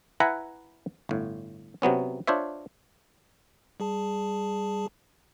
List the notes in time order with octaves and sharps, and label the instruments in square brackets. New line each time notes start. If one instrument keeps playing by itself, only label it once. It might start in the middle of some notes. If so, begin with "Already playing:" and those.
[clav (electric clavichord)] E4 B4 E5 F#5 G#5 A#5
G1 A2
C3 F#3 B3 C#4
D4 F4 C5 C#5 E5
[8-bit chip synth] G3 G#4 A5